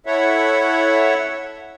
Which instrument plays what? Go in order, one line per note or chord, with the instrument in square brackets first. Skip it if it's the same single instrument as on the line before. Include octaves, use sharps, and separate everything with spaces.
[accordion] E4 A4 C#5 E5 F#5